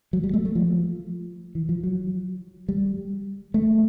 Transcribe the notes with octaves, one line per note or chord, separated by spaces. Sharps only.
F#3
G3
A3
A3
F3
E3
F3
F#3
G3
A3